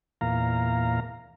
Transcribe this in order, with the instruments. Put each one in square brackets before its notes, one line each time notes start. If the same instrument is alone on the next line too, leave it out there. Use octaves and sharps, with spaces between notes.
[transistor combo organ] E2 A#2 F5 A#5